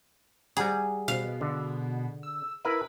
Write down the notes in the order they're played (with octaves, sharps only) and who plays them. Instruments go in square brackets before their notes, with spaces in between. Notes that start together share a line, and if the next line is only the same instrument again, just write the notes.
[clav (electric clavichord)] G3 F#5 A#5 [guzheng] G#4
[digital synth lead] B2 [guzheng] F5
[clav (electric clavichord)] D3
[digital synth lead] E6
[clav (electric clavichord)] E4 A#4 E5 [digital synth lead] B4